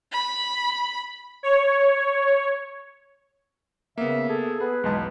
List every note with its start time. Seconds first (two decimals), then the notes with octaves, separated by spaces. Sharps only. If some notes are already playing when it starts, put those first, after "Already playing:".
0.12 B5
1.43 C#5
3.98 C#3 A#3 B3 E5
4.29 G#4 A4
4.60 B3 G#4 B4
4.84 B1 E2 G#3 A5